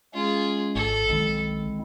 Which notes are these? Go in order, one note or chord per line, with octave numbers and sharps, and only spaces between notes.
G#3 C#4 F4 G#4
G#1 A4
B1 D#3 G#3 C4 E4